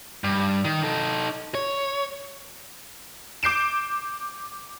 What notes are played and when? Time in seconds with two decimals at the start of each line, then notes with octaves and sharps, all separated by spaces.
0.24 G2
0.65 D#3
0.82 D#4 A4
1.55 C#5
3.43 D6 G6 C7 D7 E7